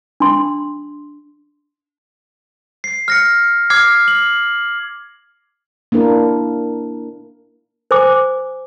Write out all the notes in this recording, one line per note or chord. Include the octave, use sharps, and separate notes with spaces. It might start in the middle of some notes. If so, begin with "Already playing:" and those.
D4 C6
C7
F6 A#6 C#7
D6 F6 G#6 C7
F#7
A#3 D4 E4 A#4
C5 G#5 D6